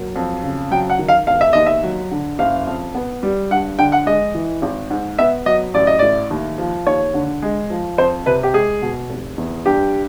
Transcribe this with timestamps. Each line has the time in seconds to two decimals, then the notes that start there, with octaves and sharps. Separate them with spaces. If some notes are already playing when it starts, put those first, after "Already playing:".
Already playing: F#3 A#3
0.16 F2
0.43 C#3
0.71 F#3 G5
0.90 F#5
0.99 D#3
1.08 F5
1.27 E1 F5
1.41 E5
1.53 D#2 D#5
1.66 E5
1.83 F#3
2.11 D3
2.39 F#1 F5
2.67 F2
2.95 B3
3.23 G3
3.51 G2 F#5
3.79 D3 G5
3.92 F#5
4.06 G#3 D#5
4.35 E3
4.62 G#1
4.90 G#2
5.19 B3 E5
5.46 F#3 D#5
5.74 A1 D5
5.87 D#5
5.99 A2 D5
6.31 D#2
6.58 F3
6.86 D#2 C#5
7.14 D3
7.42 G#3
7.70 F3
7.98 F2 C5
8.26 C3 B4
8.43 G4
8.54 G#3 G#4
8.82 B2
9.10 F1
9.38 E2
9.65 G2 G4